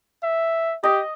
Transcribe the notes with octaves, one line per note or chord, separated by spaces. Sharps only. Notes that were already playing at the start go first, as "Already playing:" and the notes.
E5
G4 D#5